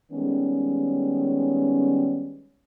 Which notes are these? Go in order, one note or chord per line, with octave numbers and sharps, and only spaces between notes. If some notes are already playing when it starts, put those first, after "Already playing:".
D#3 G3 G#3 B3 C#4